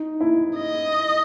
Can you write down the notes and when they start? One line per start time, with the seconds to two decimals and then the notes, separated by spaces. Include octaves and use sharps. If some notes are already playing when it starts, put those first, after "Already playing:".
Already playing: D#4
0.20 E4
0.57 D#5